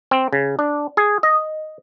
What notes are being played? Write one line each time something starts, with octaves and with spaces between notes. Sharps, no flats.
C4
C#3
D4
G#4
D#5